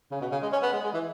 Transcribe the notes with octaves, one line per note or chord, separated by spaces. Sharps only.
C#3
B2
C#3
G#3
C#4
B3
G#3
G#3
E3